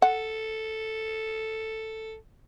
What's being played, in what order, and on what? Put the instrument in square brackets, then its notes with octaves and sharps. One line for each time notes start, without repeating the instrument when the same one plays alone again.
[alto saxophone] A4 [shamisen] F#5